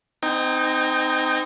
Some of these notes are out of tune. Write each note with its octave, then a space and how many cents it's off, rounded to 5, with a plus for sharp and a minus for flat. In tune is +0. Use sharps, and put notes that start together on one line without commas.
C4 -30 D#4 -5 G5 +35